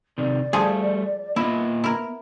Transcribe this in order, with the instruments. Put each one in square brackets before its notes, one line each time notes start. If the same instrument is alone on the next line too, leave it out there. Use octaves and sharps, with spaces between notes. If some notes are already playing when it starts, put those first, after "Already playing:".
[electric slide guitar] C3 D#3 [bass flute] D5
[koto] F3 G#4 [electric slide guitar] G3 A3
[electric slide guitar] A#3 F4 D#5 [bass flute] B3 [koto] E4
[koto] E4 A#4